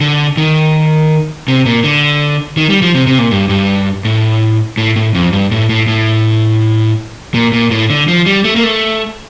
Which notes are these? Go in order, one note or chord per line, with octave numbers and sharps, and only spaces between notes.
D3
D#3
C3
A#2
D3
D#3
G3
F3
C3
C3
A#2
G2
G2
A2
A2
A2
F2
G2
A2
A2
A2
A#2
A#2
A2
D3
F3
G3
A3
A#3
A3